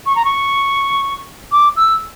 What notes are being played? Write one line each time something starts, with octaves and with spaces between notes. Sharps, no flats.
C#6
A#5
C#6
D6
E6